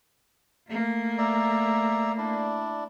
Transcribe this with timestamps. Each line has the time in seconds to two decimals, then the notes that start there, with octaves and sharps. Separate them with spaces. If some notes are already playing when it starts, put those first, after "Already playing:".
0.68 A3 A#3
1.18 D5 E5 A#5
2.18 D4 E4 D5